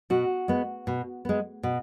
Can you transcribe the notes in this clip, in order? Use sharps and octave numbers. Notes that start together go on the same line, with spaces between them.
B2 F#4
G#3 B3
B2
G#3 B3
B2